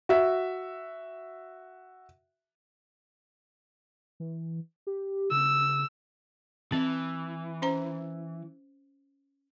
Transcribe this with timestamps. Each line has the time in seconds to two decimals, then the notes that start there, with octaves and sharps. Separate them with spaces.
0.09 F#4 E5
4.20 E3
4.87 G4
5.31 C#3 E6
6.72 E3 C4
7.62 C#4 C5 A#5